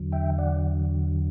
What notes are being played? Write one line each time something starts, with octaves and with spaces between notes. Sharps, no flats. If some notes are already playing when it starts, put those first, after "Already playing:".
Already playing: E2 D3 F#3
E5 G5
D5 F#5